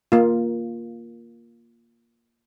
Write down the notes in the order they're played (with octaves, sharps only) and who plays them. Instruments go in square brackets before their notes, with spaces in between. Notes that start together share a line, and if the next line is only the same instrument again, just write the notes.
[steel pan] A#3 F4